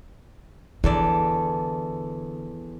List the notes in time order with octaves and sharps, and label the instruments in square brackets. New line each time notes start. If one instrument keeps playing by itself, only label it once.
[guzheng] E2 A4 D5 [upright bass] D3